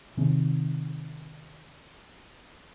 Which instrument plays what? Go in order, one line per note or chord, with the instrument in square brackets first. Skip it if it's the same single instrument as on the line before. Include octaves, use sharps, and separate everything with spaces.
[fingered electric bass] C3 D#3 C4